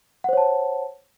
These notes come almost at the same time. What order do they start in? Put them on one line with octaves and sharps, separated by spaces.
F#5 C5 C#5 A5